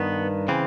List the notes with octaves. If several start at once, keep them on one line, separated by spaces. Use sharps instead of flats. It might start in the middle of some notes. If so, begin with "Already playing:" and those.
Already playing: G2 D#3 B3
C#3 E3 C4